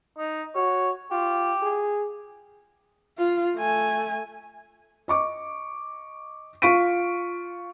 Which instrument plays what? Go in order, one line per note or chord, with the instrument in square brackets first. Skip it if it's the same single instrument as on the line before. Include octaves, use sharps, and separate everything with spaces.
[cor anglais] D#4
[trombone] F#4 [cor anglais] C#5
[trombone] F4 [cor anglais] G4
[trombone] G#4
[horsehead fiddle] F4
A3 G#5
[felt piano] D#5 C#6 D6
F4 F5 C#6 B6 D7 D#7